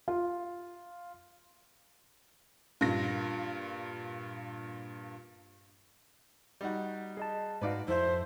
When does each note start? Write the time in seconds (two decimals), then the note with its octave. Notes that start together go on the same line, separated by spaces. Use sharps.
0.08 F4
2.81 G2 A#2 A#6
6.61 G3 D#4 F#4
7.17 G#4 D#5 A5
7.62 G#2 D#4 F#4 B4 D5 F5
7.88 F2 E4 A4 C5 E5